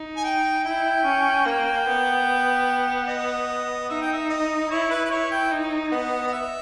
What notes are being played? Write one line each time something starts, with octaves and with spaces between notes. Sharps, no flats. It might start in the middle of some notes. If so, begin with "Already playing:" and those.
Already playing: D#4
G#5
G5
E4 G5
C#4
A#3 G5
B3
D#5
D#4 E5
G5
E5
D#5
E4 C#5
B4
B4
E4 C#5
G5
D#4
B3 D#5
D#5
E5